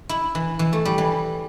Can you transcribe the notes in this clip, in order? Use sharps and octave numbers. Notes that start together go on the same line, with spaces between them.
E4
E3
E3
A3
G3
E3